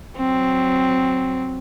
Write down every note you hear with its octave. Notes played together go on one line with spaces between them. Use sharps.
F#3 C4